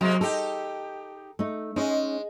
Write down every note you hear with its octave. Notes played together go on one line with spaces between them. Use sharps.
C3 F#3 G#3 A#3
D#4 G4 A4
A3 D#4
G#3 C#4 D#4